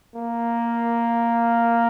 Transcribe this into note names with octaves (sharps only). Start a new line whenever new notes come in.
A#3